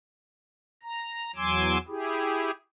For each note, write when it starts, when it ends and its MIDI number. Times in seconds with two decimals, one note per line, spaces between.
0.83 1.31 82
1.36 1.78 40
1.36 1.78 54
1.36 1.78 80
1.36 1.78 84
1.36 1.78 86
1.36 1.78 88
1.88 2.51 64
1.88 2.51 67
1.88 2.51 68